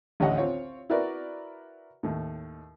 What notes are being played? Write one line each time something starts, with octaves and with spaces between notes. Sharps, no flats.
A1 D2 G4 C#5 D#5 F#5
C4 F4 C#5 F5
E4 F#4 A#4 B4 D5
D#2 A2